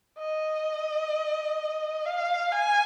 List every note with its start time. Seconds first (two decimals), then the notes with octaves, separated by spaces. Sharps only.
0.19 D#5
2.05 F5
2.52 G#5